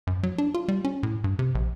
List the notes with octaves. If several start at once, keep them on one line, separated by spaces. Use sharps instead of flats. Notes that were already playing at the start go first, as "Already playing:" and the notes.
F#2
F#3
D4
F4
G3
C#4
A2
G2
C3
A#1